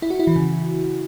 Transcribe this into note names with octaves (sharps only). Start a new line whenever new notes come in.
E4
F#4
E4
E3
C#3